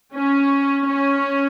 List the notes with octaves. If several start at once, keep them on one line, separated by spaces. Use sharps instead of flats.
C#4
C#4